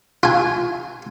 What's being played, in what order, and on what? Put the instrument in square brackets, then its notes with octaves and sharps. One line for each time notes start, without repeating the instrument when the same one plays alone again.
[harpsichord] F4 G#5